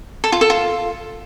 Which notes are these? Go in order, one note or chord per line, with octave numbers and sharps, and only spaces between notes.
A4
F4
A4
F4